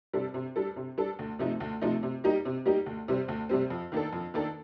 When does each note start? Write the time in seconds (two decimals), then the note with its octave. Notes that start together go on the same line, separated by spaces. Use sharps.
0.13 C3 G3 D4 A4
0.34 C3
0.56 G3 D4 A4
0.76 C3
0.98 G3 D4 A4
1.19 D2
1.39 C3 F3 A3 D#4
1.60 D2
1.81 C3 F3 A3 D#4
2.03 C3
2.24 G3 A#3 D#4 G4
2.45 C3
2.66 G3 A#3 D#4 G4
2.86 D2
3.08 C3 G3 C4
3.28 D2
3.49 C3 G3 C4
3.70 F2
3.92 D#3 A#3 D4 A4
4.13 F2
4.34 D#3 A#3 D4 A4